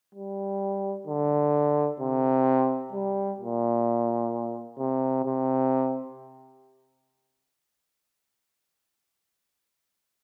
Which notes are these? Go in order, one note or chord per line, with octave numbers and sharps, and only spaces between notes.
G3
D3
C3
G3
A#2
C3
C3